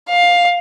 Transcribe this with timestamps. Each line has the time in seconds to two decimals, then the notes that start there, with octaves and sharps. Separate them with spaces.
0.11 F5